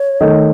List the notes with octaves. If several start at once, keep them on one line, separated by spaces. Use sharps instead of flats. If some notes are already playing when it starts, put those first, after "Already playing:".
Already playing: C#5
D#3 A3 D#4